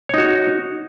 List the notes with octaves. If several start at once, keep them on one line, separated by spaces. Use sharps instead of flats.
D#4 F#4 C#5